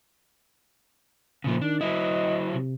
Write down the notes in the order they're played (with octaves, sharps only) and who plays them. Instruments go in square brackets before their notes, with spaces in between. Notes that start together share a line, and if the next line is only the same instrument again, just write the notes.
[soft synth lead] A#2 [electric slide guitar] C#3 F3
[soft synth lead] D#3 [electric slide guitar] D4
[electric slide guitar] F#3 E4 [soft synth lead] D#5
[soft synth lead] C3